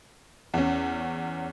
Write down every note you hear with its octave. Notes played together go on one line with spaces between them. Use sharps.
E2 C#4